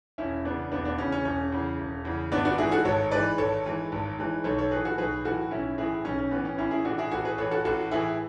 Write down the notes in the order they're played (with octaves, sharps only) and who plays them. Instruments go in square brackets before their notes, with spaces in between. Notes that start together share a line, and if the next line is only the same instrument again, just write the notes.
[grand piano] E1 C#4 E4
E2 C#3 B3 D4
E1 B3 D4
B3 D4
E2 C#3 C#4
C#4
E1 C#4
E2 C#3
E1
E2 C#3
G#1 B3 D4
D4 F#4
G#2 E3 E4 G#4
F#4 A4
G#1 A4 C#5
G#2 E3 B4 D5
G#1 A4 C#5
G#2 E3
G#1
G#2 E3
B1 A4 C#5
A4 C#5
A2 E3 G#4 B4
F#4 A4
B1 G#4 B4
A2 E3 F#4 A4
B1 C#4 E4
A2 E3 E4 G#4
B1 C#4
C#4
A2 E3 B3
C#4
A1 C#4 E4
E4 G#4
A2 E3 D4 F#4
E4 G#4
A1 F#4 A4
G#4 B4
A2 E3 A4 C#5
F#4 A4
A1 F#4 A4
A2 E3 E4 G#4